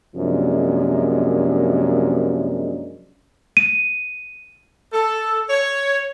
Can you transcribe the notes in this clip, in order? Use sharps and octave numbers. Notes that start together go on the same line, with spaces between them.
F#2 C3 F3 G#3 A#3 D4
D#7
A4
C#5